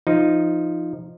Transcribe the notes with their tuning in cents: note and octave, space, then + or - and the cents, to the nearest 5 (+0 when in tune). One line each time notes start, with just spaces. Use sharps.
F3 -10 D#4 +0